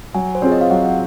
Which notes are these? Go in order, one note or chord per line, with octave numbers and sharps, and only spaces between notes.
F#3 G#5
C5
C4 F4 G#4 C#5
D#5
F5
F#3 F#5